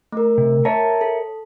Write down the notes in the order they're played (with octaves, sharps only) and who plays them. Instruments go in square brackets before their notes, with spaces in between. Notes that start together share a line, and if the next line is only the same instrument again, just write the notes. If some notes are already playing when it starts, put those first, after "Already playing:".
[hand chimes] A3 A#4
[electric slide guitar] C3
[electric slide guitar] A#4 C#5 E5 [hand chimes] A5
[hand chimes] A4